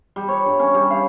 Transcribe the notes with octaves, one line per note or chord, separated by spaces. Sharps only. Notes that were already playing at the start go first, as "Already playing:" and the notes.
G3
C#5
G2
C#4
G3
F5